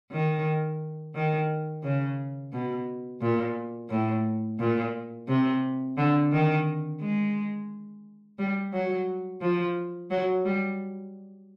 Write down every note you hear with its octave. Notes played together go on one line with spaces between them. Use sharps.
D#3
D#3
C#3
B2
A#2
A2
A#2
C3
D3
D#3
G#3
G3
F#3
F3
F#3
G3